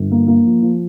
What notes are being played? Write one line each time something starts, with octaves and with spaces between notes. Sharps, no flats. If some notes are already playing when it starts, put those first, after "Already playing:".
Already playing: G1
A#3
A#3
F3
F3